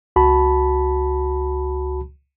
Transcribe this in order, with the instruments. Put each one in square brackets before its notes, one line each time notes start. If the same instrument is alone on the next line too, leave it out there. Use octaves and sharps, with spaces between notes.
[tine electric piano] C#2 F#4 A5 B5